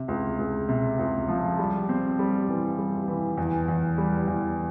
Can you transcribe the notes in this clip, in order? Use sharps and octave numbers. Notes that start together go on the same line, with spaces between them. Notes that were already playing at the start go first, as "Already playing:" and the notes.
Already playing: C3
C#2
C#2
C3
C#2
F3
G3
C4
G3
E3
G3
E3
E2
E2
G3
E2